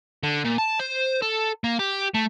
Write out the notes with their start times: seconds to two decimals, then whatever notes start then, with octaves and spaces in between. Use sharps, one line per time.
0.23 D3
0.44 A#2
0.58 A5
0.80 C5
1.22 A4
1.64 A#3
1.79 G4
2.14 A3